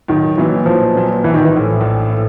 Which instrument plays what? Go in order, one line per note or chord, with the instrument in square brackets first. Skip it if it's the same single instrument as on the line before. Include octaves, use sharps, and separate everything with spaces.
[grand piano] B1 [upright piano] D#3
[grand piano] A#2 F#3 B3 [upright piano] E3
[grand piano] B1 [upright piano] F3
[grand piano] A#2 F#3 B3
[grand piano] A#1 [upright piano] E3
[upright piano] D#3
E3
[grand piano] A2 F3
A#1
A2